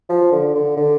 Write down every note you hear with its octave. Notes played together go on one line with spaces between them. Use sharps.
F3
D3
D3
D3